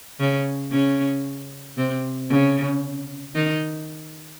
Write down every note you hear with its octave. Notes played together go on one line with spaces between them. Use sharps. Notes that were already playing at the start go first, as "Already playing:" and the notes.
C#3 C#4
C#3 C#4
C3 C4
C#3 C#4
D#3 D#4